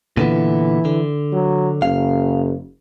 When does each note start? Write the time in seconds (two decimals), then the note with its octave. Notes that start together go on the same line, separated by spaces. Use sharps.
0.17 A#2 D3 E3 B3
0.85 D3
1.33 F#3
1.82 F#1 F5